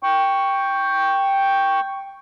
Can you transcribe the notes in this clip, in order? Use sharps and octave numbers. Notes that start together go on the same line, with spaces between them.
G5 C#6